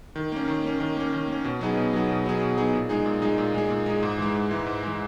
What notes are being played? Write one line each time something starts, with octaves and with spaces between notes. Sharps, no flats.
D#3
A#3 C#4
D#3
A#3 C#4
D#3
A#3 C#4
D#3
A#3 C#4
B2
F#3 B3 D#4 G#4
B2
F#3 B3 D#4 G#4
B2
F#3 B3 D#4 G#4
B2
F#3 B3 D#4 G#4
A#2
G#3 D#4 G#4
A#2
G#3 D#4 G#4
A#2
G#3 D#4 G#4
A#2
G#3 D#4 G#4
G#2
E3 G#3
G#2
E3 G#3
G#2
E3 G#3